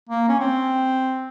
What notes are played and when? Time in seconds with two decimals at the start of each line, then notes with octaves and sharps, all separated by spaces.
0.09 A#3
0.29 C#4
0.39 C4